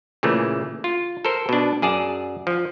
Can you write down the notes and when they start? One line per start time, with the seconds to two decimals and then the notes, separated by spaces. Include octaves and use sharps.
0.23 A#2 C#3 E3 A3
0.84 F4
1.25 A4 A#4 C5
1.49 B2 D4
1.82 F#2 G#4 D5 A5
2.47 F3